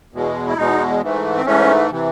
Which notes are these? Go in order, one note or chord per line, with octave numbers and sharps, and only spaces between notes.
E2 B2 G#3
E4
E2 B2 G#3 D#4
G#2 E3 A3
C4
G#2 E3 A3 C#4
C3 E3